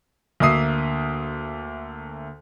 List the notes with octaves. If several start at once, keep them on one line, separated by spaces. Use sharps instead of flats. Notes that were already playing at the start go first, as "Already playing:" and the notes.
D2 A#3 E5 D#6 C7